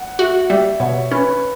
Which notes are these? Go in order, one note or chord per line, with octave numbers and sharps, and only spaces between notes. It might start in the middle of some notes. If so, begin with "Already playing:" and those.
Already playing: F#5
F#4 E5
G3 E5
B2 C#5
C#4 B4